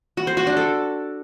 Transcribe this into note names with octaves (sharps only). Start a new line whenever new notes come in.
F#4
C5
F#4
D4
A4